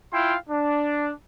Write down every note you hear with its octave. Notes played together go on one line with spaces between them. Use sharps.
E4 F4 F5 G5 C6
D4